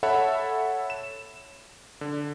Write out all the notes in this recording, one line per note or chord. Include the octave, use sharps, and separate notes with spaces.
A4 C#5 E5 F#5 A5 B5
E7
D3